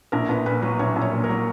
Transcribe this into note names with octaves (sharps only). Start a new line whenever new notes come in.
A#1 A#4
A#1 B4
A#2 B4
F#3 B4
A#1 C#5
A#1
C#5
A#2
A#4
F#3